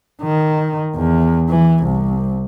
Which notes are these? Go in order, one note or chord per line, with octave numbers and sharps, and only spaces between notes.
D#3
E2
E3
C2